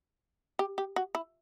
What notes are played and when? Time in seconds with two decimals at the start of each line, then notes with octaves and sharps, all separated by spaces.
0.59 G4
0.78 G4
0.96 F#4
1.15 E4